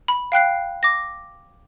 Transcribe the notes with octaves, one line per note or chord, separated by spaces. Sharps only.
B5
F5 G5 F#6 C7
D6 A#6